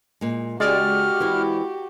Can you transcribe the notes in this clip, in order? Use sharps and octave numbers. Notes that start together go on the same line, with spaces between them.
A#2 G#3
C#3 G#3 F#4 G4 D5 F6
E3 C4 E4